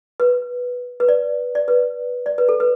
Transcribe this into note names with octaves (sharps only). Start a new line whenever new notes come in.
B4
B4
D5
D5
B4
D5
B4
A4
B4